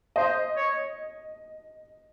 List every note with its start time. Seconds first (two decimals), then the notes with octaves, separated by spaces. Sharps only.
0.16 C5 D#5
0.56 C#5